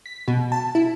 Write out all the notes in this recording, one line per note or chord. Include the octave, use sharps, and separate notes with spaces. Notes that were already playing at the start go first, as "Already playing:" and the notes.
B6
B2
A5
E4